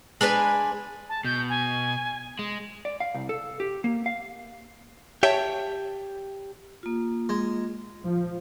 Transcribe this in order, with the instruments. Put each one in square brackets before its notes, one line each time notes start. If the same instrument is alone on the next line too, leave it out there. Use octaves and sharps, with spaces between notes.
[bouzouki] G#3 D4 B4 G#5
[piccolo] A5
[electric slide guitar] B2 [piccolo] G6
[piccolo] G#5
[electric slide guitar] G#3
[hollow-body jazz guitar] D5
F5
C2
A4
G4
A#3
F5
[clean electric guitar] G4 A5 [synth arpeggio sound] C#5 E5 G5
[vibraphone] A#3 F4
[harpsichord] G#3
[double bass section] F3